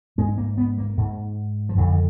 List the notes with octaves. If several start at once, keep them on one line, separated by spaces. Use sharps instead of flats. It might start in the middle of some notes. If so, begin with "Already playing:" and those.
G#2 G#3
A#3
B3
A#3
G#2
F3
F2 D3 F#3
D#3